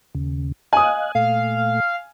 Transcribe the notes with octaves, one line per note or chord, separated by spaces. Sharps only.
D#2 C#3
D#5 F5 G#5 D#6 F#6
A#2 A3 F5